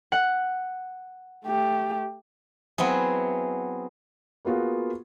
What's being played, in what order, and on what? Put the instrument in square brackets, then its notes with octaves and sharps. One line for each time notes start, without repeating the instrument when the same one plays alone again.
[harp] F#5
[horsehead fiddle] A3 G4
[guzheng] F#3 B3 C4 E4 G#4
[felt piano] A#3 B3 F4 F#4 G#4